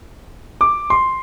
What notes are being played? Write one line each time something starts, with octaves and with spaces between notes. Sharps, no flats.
D6
C6